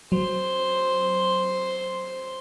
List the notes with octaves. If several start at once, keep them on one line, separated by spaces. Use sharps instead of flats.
F#3 C5 C6